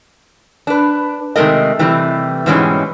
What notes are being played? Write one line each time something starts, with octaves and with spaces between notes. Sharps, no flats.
D4 B4
C3 D#3 G#3 A3 A#4 D#5
C3 E3 G3 A3
G#2 B2 E3 G3 G#3 C#4